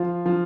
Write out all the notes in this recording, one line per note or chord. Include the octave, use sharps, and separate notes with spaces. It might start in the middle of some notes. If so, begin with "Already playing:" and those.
Already playing: F3 F4
F3